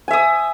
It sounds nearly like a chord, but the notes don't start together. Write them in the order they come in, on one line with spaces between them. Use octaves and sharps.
G#5 E5 D#6